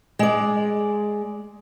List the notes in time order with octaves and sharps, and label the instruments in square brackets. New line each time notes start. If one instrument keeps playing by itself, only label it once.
[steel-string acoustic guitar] G#3 D5